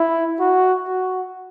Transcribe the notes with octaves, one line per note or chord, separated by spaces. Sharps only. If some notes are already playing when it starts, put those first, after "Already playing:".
Already playing: E4
F#4
F#4